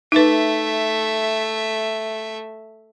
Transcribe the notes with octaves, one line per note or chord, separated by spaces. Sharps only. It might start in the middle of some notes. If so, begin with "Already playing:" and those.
A3 D#4 B4 E5